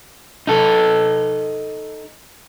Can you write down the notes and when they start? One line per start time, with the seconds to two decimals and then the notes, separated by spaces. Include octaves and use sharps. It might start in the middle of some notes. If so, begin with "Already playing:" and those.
0.47 D#4 A4